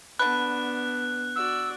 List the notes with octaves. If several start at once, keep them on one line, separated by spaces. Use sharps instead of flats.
D3 B3 D4 B4 F#6
F#4 D5 E6